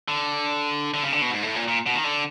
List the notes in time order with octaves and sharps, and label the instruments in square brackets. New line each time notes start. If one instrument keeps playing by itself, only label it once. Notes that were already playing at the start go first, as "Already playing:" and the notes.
[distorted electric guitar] D3
D3
C#3
D3
B2
G#2
A2
A#2
A#2
B2
D#3
D3